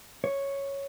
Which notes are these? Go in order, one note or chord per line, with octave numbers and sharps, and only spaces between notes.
C#5